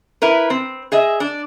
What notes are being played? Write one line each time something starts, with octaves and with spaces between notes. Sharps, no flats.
E4 A#4 B4
C4
G#4 D#5 E5
D4